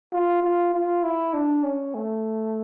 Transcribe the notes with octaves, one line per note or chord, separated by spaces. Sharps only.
F4
F4
F4
E4
D4
C#4
A3